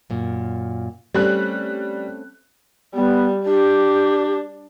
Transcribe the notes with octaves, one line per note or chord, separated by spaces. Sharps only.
F#2 A#2
G3 A3 C4 C#4 F#6
G3 B3
D4 G4